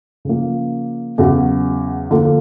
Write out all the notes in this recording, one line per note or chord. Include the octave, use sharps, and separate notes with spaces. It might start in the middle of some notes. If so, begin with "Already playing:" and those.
C#3 F3 A#3
E2 C#3 F#3
D3 F3 A#3